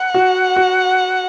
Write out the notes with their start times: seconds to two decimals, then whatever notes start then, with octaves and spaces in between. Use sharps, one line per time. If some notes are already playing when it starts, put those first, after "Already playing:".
Already playing: F#5
0.14 F#4
0.56 F#4